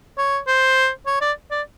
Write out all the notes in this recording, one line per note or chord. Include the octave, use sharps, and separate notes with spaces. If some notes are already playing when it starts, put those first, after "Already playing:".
C#5
C5
C#5
D5
D5